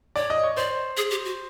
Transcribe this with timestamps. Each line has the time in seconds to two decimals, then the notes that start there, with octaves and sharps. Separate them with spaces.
0.16 C#5 D5
0.30 D#5
0.43 C#5
0.57 C5 D5
0.97 G#4
1.11 G4
1.25 F#4